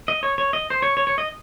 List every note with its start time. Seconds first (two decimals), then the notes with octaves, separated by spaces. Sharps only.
0.08 D#5
0.23 C#5
0.38 C#5
0.53 D#5
0.70 C5
0.82 C#5
0.97 C#5
1.07 C#5
1.18 D#5